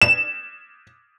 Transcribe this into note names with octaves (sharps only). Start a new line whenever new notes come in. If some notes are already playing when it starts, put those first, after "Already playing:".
E7